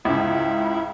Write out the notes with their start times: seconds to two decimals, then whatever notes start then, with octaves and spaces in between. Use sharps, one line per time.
0.05 C#2 G#2 C#3 E4